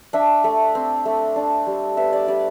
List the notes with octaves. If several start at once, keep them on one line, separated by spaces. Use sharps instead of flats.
D4 E5
A3
C4
A3
D4
G3
B3 E5
D5
G3 D5